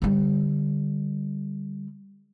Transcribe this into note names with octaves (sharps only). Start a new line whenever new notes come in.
D3 G3